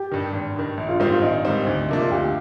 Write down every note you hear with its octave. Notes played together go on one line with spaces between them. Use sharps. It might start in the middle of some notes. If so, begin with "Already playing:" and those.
Already playing: G4
G2 D#3
G#1
G2 D#3
A#1
F4
G#2 D#3 G3 C4 F4
F4
A#1 D#4
G#2 D#3 G3 C4
D2
C3 F3 A#3 D4
F4
D2 G4